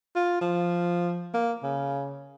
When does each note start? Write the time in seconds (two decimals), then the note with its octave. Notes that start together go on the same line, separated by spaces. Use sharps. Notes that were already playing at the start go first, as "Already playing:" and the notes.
0.16 F4
0.41 F3
1.34 A#3
1.63 C#3